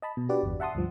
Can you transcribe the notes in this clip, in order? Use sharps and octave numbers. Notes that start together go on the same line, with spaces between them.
D#5 A5 B5
B2
D4 F#4 G4 B4 D5
G1 E2
E5 F#5 A5 C6 D#6
D2 G2 F3